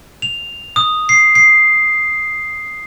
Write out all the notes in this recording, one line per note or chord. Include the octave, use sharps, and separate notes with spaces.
F7
D#6
C7
C7